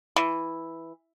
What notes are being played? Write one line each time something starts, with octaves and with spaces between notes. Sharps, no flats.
E3